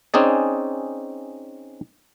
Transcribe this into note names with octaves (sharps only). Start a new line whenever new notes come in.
C4 C#4 D#4 G#4 D5